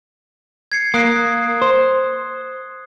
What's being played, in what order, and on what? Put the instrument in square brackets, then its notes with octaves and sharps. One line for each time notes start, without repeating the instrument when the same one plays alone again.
[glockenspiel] G#6 C7 C#7
[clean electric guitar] A#3 [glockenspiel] D#6 F#6 C7
[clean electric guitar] C5